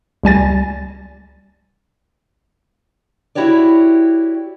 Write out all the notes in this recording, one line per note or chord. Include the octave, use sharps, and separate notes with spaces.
C#2 G3 G#5 A6
E4 F#4 G4 C#5 D5